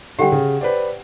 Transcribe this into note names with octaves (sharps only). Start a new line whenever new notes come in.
D3 G3 G4 F#5 G5
C#3
B4 C5 D5